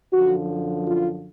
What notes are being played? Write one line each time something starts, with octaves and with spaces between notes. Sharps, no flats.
F#2 D3 F3 F#4
F4